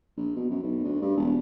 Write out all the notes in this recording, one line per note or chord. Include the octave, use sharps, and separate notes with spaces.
A#1
B2
F#2
B1
D2
G2
E1